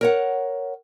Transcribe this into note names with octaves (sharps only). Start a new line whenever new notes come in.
A#4 C#5 F#5